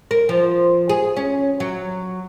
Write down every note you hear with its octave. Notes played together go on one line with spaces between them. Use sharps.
A#4
F3
G#4
C#4
F#3